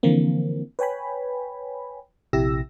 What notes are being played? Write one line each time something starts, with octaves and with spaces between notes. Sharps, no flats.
D3 E3 F3 A#3 C4
B4 C#5 G5 G#5 B5
A#1 C3 E4 G4 E6 A#6